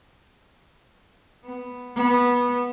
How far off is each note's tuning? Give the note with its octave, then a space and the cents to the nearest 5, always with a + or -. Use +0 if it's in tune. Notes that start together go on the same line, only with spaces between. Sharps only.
B3 +0
B3 -15